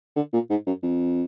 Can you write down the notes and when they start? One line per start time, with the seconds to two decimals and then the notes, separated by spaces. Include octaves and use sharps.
0.16 D3
0.33 A#2
0.50 G#2
0.67 F#2
0.83 F2